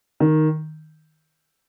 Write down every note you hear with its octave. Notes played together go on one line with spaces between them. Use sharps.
D#3